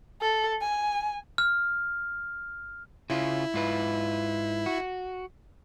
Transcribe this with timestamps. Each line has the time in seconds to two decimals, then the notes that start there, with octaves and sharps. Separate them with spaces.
0.22 A4
0.62 G#5
1.38 F6
3.10 C#3 C#4 E4 F4
3.54 G#2 F4 B4
4.66 F#4